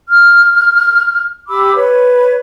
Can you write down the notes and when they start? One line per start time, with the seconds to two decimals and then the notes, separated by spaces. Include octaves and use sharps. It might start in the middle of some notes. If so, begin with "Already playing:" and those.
0.08 F6
1.48 G4 B5 D6 E6
1.75 B4 C#5